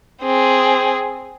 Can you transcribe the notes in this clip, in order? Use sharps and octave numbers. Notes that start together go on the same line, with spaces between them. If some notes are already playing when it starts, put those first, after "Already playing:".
C4 G#4